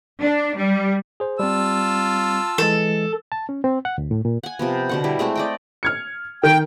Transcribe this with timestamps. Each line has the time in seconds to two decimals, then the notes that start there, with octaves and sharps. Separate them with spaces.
0.21 D4
0.57 G3
1.20 G#4 C5
1.39 G3 C4 F4 A5 E6
2.58 E3 G#3 A4
3.32 A5
3.49 C#4
3.64 C4
3.85 F#5
3.98 D2
4.11 A2
4.25 A#2
4.43 F#5 G#5
4.59 C3 F3 B3
4.89 B2 D3 F#5
5.04 G3 E4
5.19 G#3 A3 C4 E4
5.35 D5 D#5 G5
5.83 F6 G#6 C#7
6.43 D#3 G5